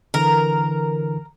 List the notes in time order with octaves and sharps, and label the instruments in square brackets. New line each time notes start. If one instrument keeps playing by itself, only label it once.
[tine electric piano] D3 E3 [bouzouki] A#4